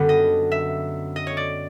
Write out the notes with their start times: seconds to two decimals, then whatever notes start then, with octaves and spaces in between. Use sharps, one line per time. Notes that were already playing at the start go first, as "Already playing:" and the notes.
Already playing: F#2 D3 G3 B3
0.09 D#5
0.52 E5
1.16 D#5
1.27 C#5
1.37 D5